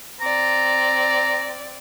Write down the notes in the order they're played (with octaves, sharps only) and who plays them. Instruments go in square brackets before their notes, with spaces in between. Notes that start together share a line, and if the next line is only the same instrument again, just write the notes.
[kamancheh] C4 D5 [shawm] A#5